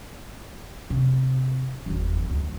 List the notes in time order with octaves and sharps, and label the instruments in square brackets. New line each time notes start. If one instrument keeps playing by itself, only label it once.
[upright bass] C3
F#1 E2
D2